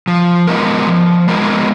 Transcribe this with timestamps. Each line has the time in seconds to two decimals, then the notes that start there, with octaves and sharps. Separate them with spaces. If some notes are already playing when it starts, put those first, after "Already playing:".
0.08 F3
0.47 G#3 B3 D#4 A#4
0.87 F3
1.28 G#3 B3 D#4 A#4